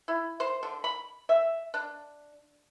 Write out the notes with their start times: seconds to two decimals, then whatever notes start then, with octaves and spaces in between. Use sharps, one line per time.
0.08 E4
0.40 C5
0.63 D3
0.84 B5
1.29 E5
1.74 D4